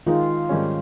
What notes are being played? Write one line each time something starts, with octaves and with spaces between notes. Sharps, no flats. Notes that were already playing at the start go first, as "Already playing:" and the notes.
D#3 G#3 D#4 F4
G#2 D#3 G3 C#4